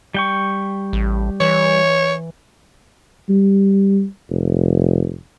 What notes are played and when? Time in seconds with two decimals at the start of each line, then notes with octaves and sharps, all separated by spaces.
0.15 G3 G5 C#6
0.93 A1
1.41 E3 C#5
3.29 G3
4.30 F1